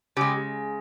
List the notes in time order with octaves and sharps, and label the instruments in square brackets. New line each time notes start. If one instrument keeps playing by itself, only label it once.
[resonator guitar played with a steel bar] C#3 G#3 G4